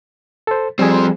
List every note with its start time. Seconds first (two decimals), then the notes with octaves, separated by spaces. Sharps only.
0.47 A4 C5
0.79 F3 G3 C4 G#4